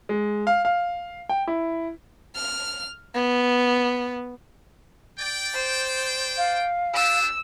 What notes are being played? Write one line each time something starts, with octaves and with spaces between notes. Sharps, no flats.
G#3
F5
F5
G5
E4
F6
B3
D5 G5
C5
F5
D4 G4 E6